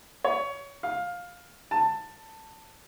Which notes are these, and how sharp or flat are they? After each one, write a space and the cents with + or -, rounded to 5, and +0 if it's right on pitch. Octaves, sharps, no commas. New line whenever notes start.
C#5 +20
F5 +15
A5 +15